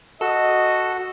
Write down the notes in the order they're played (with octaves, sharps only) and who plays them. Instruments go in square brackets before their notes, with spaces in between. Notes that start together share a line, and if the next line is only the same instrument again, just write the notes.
[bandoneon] F#4 [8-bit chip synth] A4 [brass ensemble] D#5